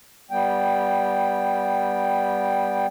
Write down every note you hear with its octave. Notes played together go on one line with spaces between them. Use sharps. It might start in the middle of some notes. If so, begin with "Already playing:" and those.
G3 B3 G5